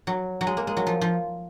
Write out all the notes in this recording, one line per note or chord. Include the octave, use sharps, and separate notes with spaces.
F#3
F#3
G#3
A#3
G#3
F#3
F3
F3